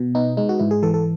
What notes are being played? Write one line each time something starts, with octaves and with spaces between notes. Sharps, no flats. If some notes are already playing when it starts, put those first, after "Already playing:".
Already playing: B2
B3 D#4
G#3 D#4
F#4
G#2 E4
G#4
E3 A4
A4